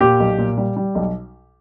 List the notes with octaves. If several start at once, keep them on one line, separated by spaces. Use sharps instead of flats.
A#2 G4
B1
A#2
G3
G3
B1